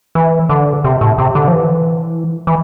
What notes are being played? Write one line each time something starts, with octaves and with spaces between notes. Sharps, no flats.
E3
D3
C3
A2
C3
D3
F3
E3
E3